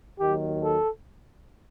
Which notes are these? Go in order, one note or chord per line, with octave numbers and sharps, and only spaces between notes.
D#2 D#3 F#3 G4
A4